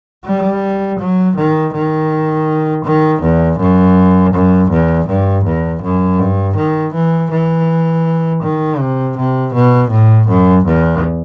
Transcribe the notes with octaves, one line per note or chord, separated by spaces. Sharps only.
G3
F#3
D#3
D#3
D#3
E2
F#2
F#2
E2
G2
E2
F#2
G2
D#3
E3
E3
D#3
C3
C3
B2
A2
F#2
E2